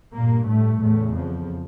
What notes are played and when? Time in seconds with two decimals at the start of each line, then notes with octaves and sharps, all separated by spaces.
0.14 G2 A#2 A#3
0.48 A2 A3
0.81 E2 A2 C#3 A3
1.15 F2 F3